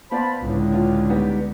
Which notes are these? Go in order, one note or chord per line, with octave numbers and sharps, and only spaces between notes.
B3 C5 D5 F5 A5 B5
C#2 A2 D3
D4 F4
G3 B3 D#4